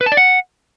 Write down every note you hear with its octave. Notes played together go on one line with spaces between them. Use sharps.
B4
A5
D5
F#5